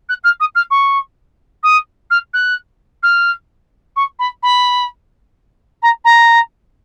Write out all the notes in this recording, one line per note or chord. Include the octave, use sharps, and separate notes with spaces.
F#6
F6
D#6
F6
C#6
D#6
F6
F#6
F6
C#6
B5
B5
A#5
A#5